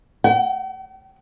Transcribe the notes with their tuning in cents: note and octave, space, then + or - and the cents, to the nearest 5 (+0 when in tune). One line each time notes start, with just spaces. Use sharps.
G5 -45